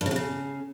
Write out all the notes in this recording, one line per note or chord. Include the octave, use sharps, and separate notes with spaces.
G2
C#3
C3
C#3